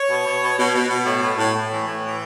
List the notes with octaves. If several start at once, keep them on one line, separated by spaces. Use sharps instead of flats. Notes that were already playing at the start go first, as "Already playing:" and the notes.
Already playing: C#5
B2
B2
B2
B2
B2
B2
A2
A2
A2
A2
E3
A2
E3